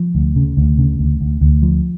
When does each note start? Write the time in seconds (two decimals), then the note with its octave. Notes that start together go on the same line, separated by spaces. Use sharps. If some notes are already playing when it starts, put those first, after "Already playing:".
Already playing: F3
0.15 D2
0.36 C#3
0.57 D2
0.78 C#3
0.99 D2
1.21 D2
1.41 D2
1.62 F3